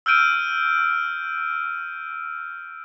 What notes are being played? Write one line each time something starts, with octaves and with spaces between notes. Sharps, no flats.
E6 F6 G6 D7 D#7